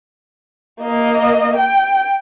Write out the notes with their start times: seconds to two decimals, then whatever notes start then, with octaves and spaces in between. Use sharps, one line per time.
0.81 A#3 D#5
1.56 G5